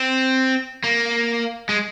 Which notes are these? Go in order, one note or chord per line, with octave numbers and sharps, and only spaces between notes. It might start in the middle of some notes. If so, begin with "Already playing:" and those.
Already playing: C4
A#3
G#3